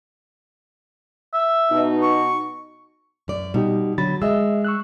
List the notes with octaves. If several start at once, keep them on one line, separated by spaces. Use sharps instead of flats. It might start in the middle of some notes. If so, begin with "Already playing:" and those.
E5
B2 D#4
C#6
F#2 D5
B2 G3 D#4 G4
D3 F#3 B5 A6
G#3 D#5 E5 E6
C#6 E6 F#6